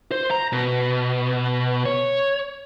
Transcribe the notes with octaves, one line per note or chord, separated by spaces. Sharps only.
C5
A#5
B2
C#5